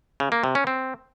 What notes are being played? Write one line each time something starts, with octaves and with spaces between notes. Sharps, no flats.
C#3
A#3
C3
C#4
C4